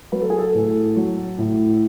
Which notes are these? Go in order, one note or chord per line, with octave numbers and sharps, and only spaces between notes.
F#3 B4
A4
G#4
A4
A2
F#3
A2